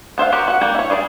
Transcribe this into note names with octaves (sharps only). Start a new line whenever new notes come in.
B3 C5 E5 F5
B3 F#4 G4 A#4 F#5
F#4 F#5
G3 A#3 G5
E4 C#5
G3 G#4 B4 D5